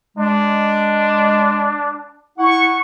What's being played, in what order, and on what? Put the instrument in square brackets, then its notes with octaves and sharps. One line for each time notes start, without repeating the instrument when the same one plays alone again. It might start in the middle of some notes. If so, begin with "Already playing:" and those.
[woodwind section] G#3 [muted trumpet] D4
[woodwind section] E4 F#5 [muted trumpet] C#6